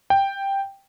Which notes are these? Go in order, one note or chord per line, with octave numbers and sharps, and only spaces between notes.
G5